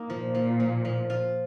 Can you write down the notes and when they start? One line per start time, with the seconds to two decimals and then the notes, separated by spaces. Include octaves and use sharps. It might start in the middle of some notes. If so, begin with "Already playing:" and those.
Already playing: A#3 D#4
0.10 A#2 F3
0.35 F3
0.60 F3
0.85 F3
1.10 F4